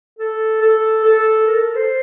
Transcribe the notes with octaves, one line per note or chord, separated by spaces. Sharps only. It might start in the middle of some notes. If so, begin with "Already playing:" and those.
A4
A4
A4
A#4
A4
C5